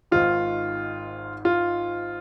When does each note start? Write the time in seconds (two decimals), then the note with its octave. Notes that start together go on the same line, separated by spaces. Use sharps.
0.11 G#1 G#2 D#3 F4
1.45 F4